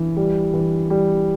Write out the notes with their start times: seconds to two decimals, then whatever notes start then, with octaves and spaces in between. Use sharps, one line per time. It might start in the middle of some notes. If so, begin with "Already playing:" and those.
Already playing: E3
0.17 G3
0.54 E3
0.90 G3